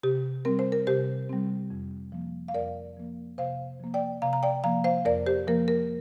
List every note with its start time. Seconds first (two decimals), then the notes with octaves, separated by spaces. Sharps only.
0.03 C3 G4
0.45 G3 C4 A#4
0.59 C5
0.72 A#4
0.87 C3 G4 C5
1.29 G3 C4
1.70 F2
2.12 F3 A#3
2.48 F5
2.54 F2 A#4 D5
2.97 F3 A#3
3.38 C3 C5 F5
3.80 F3 A#3
3.94 D5 G5
4.22 C3 F5 A#5
4.33 A#5
4.43 D5 G5
4.64 F3 A#3 F5 A#5
4.84 C5 F5
5.05 F2 A#4 D5
5.26 G4 C5
5.47 F3 A#3 A#4
5.68 A#4